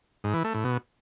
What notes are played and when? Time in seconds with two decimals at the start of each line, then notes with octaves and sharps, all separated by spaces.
0.24 G#2
0.34 E3
0.44 A3
0.54 A2
0.64 B2